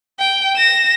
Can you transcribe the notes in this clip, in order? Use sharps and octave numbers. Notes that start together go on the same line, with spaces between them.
G5
A#6 E7